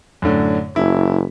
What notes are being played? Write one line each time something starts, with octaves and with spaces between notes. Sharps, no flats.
F#2 A2 D3
F#1 E4